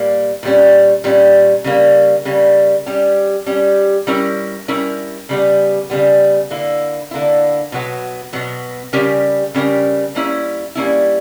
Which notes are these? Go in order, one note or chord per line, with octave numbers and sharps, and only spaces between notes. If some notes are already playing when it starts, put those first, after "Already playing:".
Already playing: A#2 G3 A#3
A#2 G3 C#4
A#2 G3 C#4
C#3 G3 A#3
C#3 G3 A#3
G3 C#4 G4
G3 C#4 G4
G3 C#4 E4 A#4
G3 C#4 E4 A#4
C#3 G3 B3
C#3 G3 B3
D3 A#3 E4
D3 A#3 E4
B2 F#3 B3
B2 F#3 B3
C#3 G3 C#4 G4 A#4
C#3 G3 C#4 G4 A#4
G3 A#3 C#4 E4
G3 A#3 C#4 E4